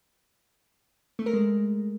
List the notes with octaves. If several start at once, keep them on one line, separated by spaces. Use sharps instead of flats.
A3
A#4
G#3